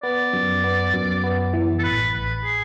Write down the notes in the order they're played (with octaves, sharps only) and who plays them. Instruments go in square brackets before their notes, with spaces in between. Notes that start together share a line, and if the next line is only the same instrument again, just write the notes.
[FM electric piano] B3 [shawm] D5
[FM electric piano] F#2
B3
F#2
B3
E3
[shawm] A4
[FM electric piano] A1 [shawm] B4
[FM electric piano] A1 [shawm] B4
[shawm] G#4